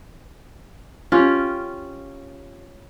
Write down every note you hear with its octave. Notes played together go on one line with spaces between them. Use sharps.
C#4 F4 G4